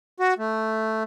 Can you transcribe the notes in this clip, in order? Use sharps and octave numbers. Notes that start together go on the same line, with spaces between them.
F#4
A3